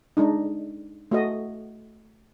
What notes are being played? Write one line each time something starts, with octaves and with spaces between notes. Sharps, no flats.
G#3 D4 D#4
A3 F#4 D#5